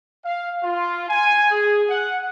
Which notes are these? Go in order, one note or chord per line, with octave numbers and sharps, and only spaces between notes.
F5
F4
G#5
G#4
F#5